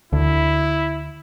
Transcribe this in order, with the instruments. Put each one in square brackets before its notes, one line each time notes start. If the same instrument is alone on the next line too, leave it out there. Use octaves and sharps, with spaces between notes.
[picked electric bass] D2 [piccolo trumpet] E4